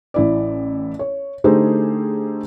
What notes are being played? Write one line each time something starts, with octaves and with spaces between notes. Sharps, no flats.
A1 E4 D5
C#5
D3 A3 D#4 G4 G#4 C5